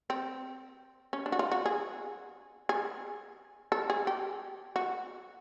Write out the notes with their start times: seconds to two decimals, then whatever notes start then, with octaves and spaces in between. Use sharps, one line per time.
0.10 C4
1.13 C#4
1.26 D4
1.32 F#4
1.39 F4
1.52 F#4
1.66 G#4
2.69 G#4
3.72 A4
3.90 G#4
4.07 G4
4.76 F#4